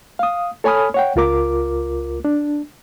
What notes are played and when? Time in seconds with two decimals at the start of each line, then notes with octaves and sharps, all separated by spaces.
0.19 F5 D#6
0.64 A4 C#5 G#5 B5 D#6 F6
0.94 C#5 F#5 G5
1.16 C#2 F4 A#4 D6
2.25 D4